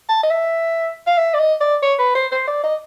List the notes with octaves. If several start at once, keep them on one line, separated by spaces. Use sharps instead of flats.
A5
D#5
E5
F5
E5
D5
D#5
D5
C#5
B4
C5
C5
D5
D#5